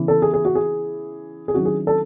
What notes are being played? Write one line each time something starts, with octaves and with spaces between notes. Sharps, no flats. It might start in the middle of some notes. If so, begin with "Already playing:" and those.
Already playing: C#3 E3 B3 E4
A4
G#4
G#4
F#4
G#4
G#4
D#3 F#3 C#4 E4 F#4
G#4
A4